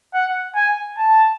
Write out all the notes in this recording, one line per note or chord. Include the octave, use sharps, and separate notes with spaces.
F#5
G#5
A5